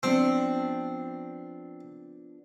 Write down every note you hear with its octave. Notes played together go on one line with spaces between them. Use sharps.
F3 B3 C4 D4